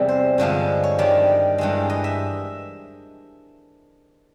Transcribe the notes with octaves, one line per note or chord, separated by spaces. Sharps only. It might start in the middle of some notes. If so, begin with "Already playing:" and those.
Already playing: E2 C3 E3 G3
C5
G2 D3 F3 G#3
C#5
G2 D#3 G3 D5
G2 E3 G#3
D#5
E5